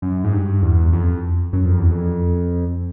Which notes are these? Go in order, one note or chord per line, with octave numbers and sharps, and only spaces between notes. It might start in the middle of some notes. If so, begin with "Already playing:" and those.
F#2
G#2
G2
E2
F2
F#2
F2
E2
F2